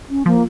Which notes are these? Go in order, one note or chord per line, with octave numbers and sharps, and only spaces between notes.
C#4
F3 A#3